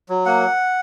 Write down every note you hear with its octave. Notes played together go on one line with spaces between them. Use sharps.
F#3
A#3 F#5